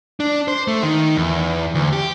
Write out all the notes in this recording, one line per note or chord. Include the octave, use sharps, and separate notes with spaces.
D4
C5
A3
D#3
E2
D2
G4